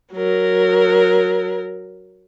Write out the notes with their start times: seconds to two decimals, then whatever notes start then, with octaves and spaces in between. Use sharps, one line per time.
0.13 F#3 A#4